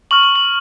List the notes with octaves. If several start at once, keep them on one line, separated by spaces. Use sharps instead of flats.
C#6 F6 F#7
F#7
F#7